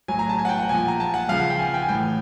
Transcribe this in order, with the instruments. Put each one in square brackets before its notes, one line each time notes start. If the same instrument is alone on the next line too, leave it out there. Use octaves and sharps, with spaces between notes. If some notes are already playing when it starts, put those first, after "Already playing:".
[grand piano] A2 F#3 G#5
A#5
A5
G#5
F#5
G5
F#5
A#2 F3 G#5
A#5
A5
F#5
C#3 F3 F5
F#5
G5
G#5
G5
G#5
A2 E3 G5